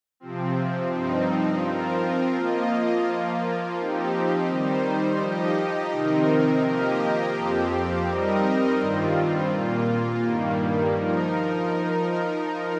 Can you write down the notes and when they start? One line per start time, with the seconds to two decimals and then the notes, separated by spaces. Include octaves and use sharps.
0.20 C3 F3 C4
0.91 G2 F3 C4 D#4
1.62 F3 C4 F4 A#4
2.34 F3 A#3 F4 D#5
3.06 F3 A#3 F4
3.78 F3 C4 D#4 G4
4.49 D#3 G3 D#4 C5
5.20 F3 D#4 G4 D#5
5.92 C3 D#3 C4 D#4 A#4
6.63 F3 A#3 G4 A#4 D#5
7.35 F2 F3 C4 G4
8.07 G3 C4 D#4 A#4 D#5
8.79 G2 D#3 G3 C4 F4
9.51 A#2 A#3 F4
10.22 G2 D#3 G3 A#3
10.93 F3 D#4 A#4